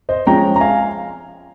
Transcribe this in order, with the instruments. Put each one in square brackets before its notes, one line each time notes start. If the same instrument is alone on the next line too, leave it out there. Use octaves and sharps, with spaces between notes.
[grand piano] C5 D#5
F3 G#3 C#4 G5 A#5
A#5
F5 G#5